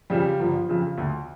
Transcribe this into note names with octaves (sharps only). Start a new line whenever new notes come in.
F2 C#3 F3 G3
G1 F3
F2 C#3 F3
D2